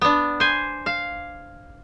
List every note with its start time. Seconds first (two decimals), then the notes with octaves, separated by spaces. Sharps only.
0.01 B3 D4
0.40 C5 G#5
0.86 F5